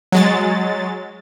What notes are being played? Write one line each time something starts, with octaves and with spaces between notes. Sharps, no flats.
F#3 G#3 A6